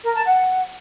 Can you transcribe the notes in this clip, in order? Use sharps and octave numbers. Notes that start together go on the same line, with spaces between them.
A#4
A5
F#5